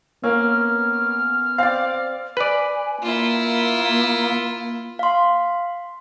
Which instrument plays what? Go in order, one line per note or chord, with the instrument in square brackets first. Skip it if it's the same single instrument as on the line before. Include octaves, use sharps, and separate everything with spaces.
[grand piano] A#3 [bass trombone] B3 [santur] C#4 [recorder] F6
[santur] C4 D5 [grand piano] F5
[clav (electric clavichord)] B4 D5 [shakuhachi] G#5
[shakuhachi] A#3 [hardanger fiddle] E4 F4
[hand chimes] F5 C6